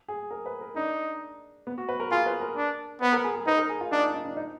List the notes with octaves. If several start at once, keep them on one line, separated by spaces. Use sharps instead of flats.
G#4
A#4
B4
A#4
D4 D#4
B3
F#4
B4
A#4
F4 G#4
B4
A#4
D4
B3 B4
A#4
G#4
G#4
D#4 B4
A#4
G#4
F4
D4 D#4
D#4
D#4
D4
D#4